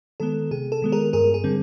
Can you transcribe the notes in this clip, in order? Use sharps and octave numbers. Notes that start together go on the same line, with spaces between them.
D#3 G#3 B3 A4
C3 G#4
A4
D#3 G#3 B3
G#4 A#4
G2 G#4 A#4
G#4
D3 G3 C4